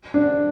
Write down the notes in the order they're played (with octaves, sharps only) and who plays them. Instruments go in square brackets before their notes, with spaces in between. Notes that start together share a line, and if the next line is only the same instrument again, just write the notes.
[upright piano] D4